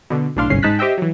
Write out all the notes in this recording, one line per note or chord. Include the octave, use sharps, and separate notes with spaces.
B2 D3
B1 A2 D4 F5 C6
G1 C2 G#2 C#4 C7
G#2 G#3 D#4 A5 F#6 B6
G4 C5 D#5 E5 G5
E3 F#3